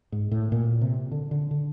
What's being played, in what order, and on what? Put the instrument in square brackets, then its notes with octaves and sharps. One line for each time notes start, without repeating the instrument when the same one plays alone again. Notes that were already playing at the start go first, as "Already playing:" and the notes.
[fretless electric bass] G#2
A2
A#2
C3
D3
D3
D3